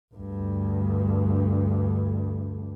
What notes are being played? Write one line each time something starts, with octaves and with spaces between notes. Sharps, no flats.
D2 G2